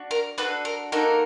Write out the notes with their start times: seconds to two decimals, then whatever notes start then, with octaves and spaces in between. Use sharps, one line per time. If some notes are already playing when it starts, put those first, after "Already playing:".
Already playing: D4 F#4
0.11 A#4
0.38 D4 F#4 A4 B4
0.65 A#4
0.92 A#3 D#4 F#4 A4 A#4